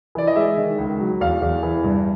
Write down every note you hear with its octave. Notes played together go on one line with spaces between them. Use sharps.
E3 D5
D#5
G#3 E5
D#3
C#2
F#3
E2 F5
E2
E3
G2